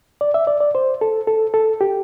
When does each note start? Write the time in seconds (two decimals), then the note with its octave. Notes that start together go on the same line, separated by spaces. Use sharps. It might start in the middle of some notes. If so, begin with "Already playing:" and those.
0.21 D5
0.34 E5
0.47 D5
0.60 D5
0.75 C5
1.01 A4
1.27 A4
1.54 A4
1.81 G4